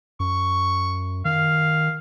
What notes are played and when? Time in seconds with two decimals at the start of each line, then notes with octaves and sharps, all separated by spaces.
0.20 F#2 C#6
1.25 D#3 F5